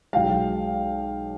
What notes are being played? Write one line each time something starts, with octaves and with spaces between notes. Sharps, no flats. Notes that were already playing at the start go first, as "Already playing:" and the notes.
B1 B2 G#3 F5 G5